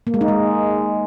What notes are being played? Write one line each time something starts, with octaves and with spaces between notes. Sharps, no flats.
A#3
G#3
D#4
G#3